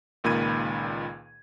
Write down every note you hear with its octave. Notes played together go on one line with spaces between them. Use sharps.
C#2 A#2 D#3 B5 G#6 D#7